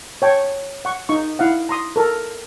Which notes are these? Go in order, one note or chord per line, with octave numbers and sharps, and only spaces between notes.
C#5 G5 A5
F#5 C#6
D#4 C#6
E4 F5 F#5
A#5 C6 D#6
A4 A#4